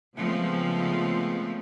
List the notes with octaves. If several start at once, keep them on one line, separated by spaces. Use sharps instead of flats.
C#3 F3 G#3 A3 B3 C4